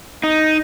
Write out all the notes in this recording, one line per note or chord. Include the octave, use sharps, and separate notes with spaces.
D#4